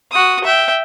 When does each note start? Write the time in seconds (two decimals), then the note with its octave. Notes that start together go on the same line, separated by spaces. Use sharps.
0.11 F#4 D#6
0.44 E5 G5